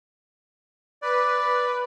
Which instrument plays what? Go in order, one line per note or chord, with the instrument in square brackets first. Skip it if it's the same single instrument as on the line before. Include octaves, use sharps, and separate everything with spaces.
[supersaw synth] B4 [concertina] D5